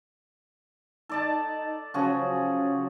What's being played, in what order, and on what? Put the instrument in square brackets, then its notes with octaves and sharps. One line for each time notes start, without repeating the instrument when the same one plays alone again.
[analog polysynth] D#4 [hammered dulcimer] A4 D5 A5
[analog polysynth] C#3 F#3 C#4 [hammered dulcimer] F3 F#4 G#4